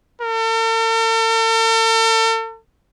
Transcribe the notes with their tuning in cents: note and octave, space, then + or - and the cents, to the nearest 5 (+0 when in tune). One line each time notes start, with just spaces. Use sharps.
A4 +45